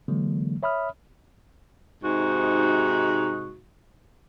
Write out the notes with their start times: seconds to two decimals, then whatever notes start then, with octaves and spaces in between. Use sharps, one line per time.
0.08 D3 E3 F#3 G#3 A#3
0.63 C#5 E5 B5 D#6 F6
2.03 G#2 C3 D#4 F#4